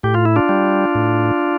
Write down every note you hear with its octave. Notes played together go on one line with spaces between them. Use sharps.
A2 G4
F4
E4
D4 F4
G3
A2